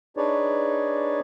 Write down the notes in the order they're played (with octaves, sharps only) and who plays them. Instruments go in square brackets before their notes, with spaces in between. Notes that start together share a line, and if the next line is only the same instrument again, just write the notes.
[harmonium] D4 D#4 G#4 B4 C#5 D5